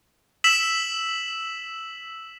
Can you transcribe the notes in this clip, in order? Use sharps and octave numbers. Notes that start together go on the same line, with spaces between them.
E6 B6 E7 F#7